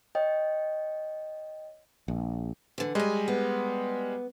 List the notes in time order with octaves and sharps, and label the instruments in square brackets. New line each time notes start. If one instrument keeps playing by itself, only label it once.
[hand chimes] C#5 D#5 G5
[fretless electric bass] A#1
[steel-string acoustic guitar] D3 E3
[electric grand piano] G3 G#3 [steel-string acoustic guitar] D#5 G#5
[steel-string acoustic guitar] B3